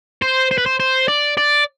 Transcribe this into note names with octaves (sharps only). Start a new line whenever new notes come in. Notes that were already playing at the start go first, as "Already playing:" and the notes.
C5
C5
B4
C5
C5
D5
D5